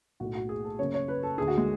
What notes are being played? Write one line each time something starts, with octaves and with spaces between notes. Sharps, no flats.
B1 A2 F#4
F#4
G#4
A4
F#1 F#2 C#3 C#5
C#5
B4
A4
D2 D3 G#4
F#4
G#3